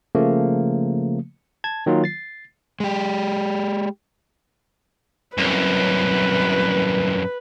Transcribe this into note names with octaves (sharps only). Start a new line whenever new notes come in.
C#3 F3 A3 A#3
A5 G#6
D#3 F#3 A#3 F4
A6 C7
G#3 G4
C2 F#2 B4